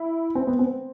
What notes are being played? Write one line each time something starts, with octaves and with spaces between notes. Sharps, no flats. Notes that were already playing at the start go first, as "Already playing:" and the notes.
Already playing: E4
C4
B3
C4